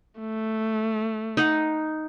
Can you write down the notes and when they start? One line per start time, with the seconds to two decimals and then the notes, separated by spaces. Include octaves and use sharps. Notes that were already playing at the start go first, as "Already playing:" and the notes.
0.20 A3
1.37 D#4 F#5